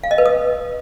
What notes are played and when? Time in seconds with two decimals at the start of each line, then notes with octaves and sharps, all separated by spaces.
0.04 F5
0.11 D#5
0.18 B4
0.26 D#6